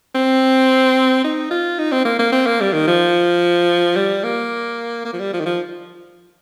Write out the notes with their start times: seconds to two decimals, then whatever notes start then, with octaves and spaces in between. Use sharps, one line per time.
0.15 C4
1.24 D#4
1.51 F4
1.79 D#4
1.92 C4
2.05 A#3
2.19 A#3
2.32 C4
2.46 A#3
2.61 G3
2.73 D#3
2.87 F3
3.96 G3
4.24 A#3
5.05 A#3
5.13 F3
5.19 G3
5.33 F3
5.40 D#3
5.46 F3